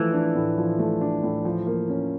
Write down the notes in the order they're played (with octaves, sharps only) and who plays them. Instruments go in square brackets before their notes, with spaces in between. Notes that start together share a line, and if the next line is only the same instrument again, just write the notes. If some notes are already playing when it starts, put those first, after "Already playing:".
Already playing: [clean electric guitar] E3 [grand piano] F3 A3
[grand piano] D4
A2
F3
A3
D4
A2
F3
A#3
C#4